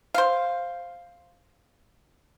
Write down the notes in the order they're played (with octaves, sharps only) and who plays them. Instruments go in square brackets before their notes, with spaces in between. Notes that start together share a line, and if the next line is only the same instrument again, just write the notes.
[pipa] C5 F5